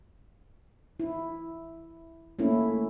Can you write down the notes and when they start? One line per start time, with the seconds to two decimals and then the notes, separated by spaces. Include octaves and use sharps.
1.00 E4
2.39 A3 A#3 C#4 E4